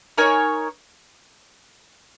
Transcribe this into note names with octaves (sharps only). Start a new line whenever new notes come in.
D#4 A#4 C#5 G#5